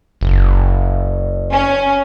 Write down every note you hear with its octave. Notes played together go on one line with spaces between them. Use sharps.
F#1
C#4